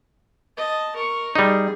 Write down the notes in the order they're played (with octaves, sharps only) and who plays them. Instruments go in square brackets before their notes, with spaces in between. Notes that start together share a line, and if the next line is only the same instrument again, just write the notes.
[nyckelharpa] D#5 A5
A#4 C#6
[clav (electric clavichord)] G3 D#4 [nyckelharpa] G#4